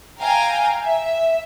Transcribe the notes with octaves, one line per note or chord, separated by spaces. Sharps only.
F5 G5 G#5 A#5
E5